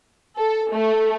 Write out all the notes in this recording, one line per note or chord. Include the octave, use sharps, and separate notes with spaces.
A4
A3